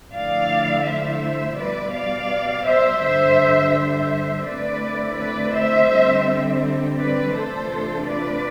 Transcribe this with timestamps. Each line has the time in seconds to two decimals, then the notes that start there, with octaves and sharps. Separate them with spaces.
0.14 D3 F3 A3 E4 D5 F5
0.86 C5 E5
1.58 B2 G3 B3 B4 D5
1.94 D5 F5
2.66 C5 E5
3.02 G2 D3 G3 C5 E5
3.74 C5 E5
4.45 D3 A3 C4 E4 B4 D5
5.17 B4 D5
5.54 C5 E5
5.89 D3 G3 C4
6.97 B4 D5
7.33 C3 E3 A3 D4 F4 A4 C5
8.05 B4 D5